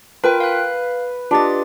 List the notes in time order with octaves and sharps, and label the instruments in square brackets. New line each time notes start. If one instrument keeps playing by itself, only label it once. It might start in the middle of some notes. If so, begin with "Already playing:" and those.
[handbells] F4 A#4 G5 [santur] B4
[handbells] F5 F#6
[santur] D4 D#5 [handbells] F4 G4 A6